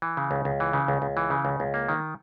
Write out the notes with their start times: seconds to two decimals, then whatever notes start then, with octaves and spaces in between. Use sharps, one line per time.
0.02 E3
0.17 C#3
0.31 C#2
0.45 C#2
0.60 E3
0.73 C#3
0.88 C#2
1.02 C#2
1.17 E3
1.30 C#3
1.45 C#2
1.60 C#2
1.74 A#3
1.89 D#3